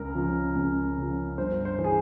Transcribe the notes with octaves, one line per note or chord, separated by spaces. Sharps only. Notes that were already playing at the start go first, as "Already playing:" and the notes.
Already playing: C#2 A#4
C#3 F3
C#2
C#3 F3
G1 C5
C5
E3
G#4